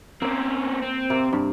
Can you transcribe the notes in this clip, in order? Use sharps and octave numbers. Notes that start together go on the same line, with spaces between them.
A#3 C4 C#4
C4
C3 A#3
G2